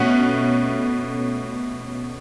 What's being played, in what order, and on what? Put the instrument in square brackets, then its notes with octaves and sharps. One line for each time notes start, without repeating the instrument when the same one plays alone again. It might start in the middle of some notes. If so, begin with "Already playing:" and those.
Already playing: [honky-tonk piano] B2 A3 C#4 F#5